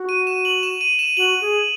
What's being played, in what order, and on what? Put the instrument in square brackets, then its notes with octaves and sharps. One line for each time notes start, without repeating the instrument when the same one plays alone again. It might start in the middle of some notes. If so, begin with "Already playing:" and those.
Already playing: [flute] F#4
[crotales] D#7
E7
F#7
E7
D#7
E7
[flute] F#4 [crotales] F#7
[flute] G#4